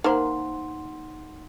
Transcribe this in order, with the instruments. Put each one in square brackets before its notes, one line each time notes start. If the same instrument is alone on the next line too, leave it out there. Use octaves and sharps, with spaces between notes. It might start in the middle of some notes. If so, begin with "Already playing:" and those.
[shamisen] A#3 A#4 C5 [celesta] D#4 F#5 C6